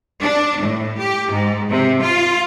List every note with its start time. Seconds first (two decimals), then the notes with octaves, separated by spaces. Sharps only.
0.21 D4
0.61 A2
0.98 G4
1.31 G#2
1.69 C3
2.01 F4